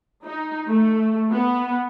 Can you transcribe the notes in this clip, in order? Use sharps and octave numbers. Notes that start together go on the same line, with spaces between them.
D#4
A3
B3